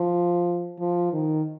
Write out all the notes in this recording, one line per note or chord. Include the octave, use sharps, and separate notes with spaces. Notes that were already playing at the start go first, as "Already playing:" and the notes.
Already playing: F3
F3
D#3